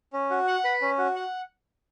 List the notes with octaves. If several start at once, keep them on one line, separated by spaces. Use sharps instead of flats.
C#4
F#4
F#5
B4
C#4
F#4
F#5